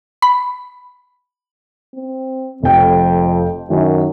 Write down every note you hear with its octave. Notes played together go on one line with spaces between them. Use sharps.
B5
C4
F1 F2 G5
F#2 D#3